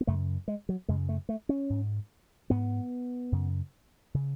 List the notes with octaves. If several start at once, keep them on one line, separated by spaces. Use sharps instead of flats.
B3
F#2 C#3 A3
G#3
F#3
F#2 C#3 G#3
A3
A3
C#4
G#2
G#2 B3
F#2 C#3
C#3